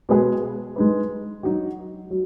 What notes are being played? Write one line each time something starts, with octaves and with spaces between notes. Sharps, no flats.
B2 G#3 B3 G#4 B4
G#3 D#4 B4
F#3 D#4 F#4
F#3